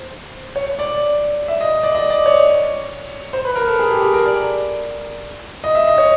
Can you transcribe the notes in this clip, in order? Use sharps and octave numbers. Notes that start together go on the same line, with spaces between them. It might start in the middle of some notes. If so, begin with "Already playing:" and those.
Already playing: C5
C#5
D5
E5
D#5
D5
D#5
D5
C#5
C5
B4
A#4
A4
G#4
G4
G#4
A#4
D5
D#5
E5
D#5
C#5